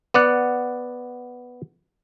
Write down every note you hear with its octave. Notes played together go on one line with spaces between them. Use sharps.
B3 D5 F#5